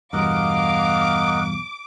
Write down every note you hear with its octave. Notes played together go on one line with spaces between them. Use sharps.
E2 G2 B2 A#4 D#5 F5 F#5 D6